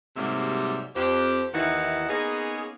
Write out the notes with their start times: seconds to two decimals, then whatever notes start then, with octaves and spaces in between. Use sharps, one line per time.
0.16 G#2 C3 F#3 G3 A#3 E5
0.95 F2 G4 C5
1.53 D#2 D#3 E3 D#4 E4 F#5
2.09 A#3 B3 C#4 D#4 G#4